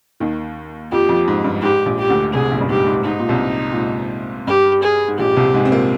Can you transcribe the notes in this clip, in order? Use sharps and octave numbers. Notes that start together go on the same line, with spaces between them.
D#2 D#3
F2 F3 G4
F2 F3
G#2
G2
G#2 G4
A#1 A#2
G4
D2 D3
C2 C3 G#4
A#1 A#2
G2
G#2 G4
G#2
G#2 D#4
A#2
C2 C3
A#2
G#2
G2 G4
G#4
G#2
A#1 A#2 G4
C2 C3
G#2 G#3
C4
A#2 A#3